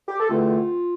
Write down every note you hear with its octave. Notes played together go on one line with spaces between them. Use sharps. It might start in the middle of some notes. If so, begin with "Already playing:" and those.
G4
A4
E2 D3 A3 C4 F4